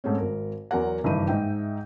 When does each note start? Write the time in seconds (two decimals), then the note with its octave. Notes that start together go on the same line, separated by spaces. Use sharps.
0.04 G#2 A3 C4 C#4
0.18 G#1 A#4
0.71 E2 F#3 A#4 F#5
1.04 F#1 G2 D#3 E3 D#4 D#7
1.28 G#2 D#4 E5 G5